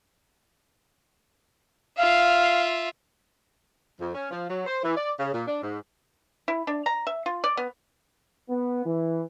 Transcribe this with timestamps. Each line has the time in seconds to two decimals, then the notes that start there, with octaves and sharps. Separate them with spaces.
1.98 F4 E5 F5
4.00 F2
4.14 C#4
4.31 F3
4.49 F#3
4.67 C5
4.84 E3
4.97 D5
5.19 C#3
5.34 A#2
5.48 D4
5.62 G#2
6.48 E4
6.67 D4
6.86 A#5
7.07 E5
7.26 F4
7.44 D5
7.57 B3
8.49 B3
8.85 E3